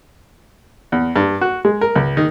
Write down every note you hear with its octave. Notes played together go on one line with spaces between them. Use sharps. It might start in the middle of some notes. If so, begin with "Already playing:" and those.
E2
G2
F#4
G#3
A#4
C#2
D#3